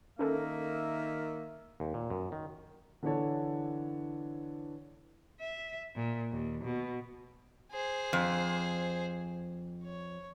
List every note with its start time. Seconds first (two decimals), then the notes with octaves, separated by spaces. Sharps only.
0.19 D#3 A#3 C#4 A4 A#4 E5
1.80 D#2
1.94 A#2
2.10 F#2
2.32 D#3
3.03 D3 E3 D4 A4 C#5 A5
5.40 E5
5.96 A#2
6.32 D#2
6.64 B2
7.72 G#4 C5
8.13 F2
9.83 C#5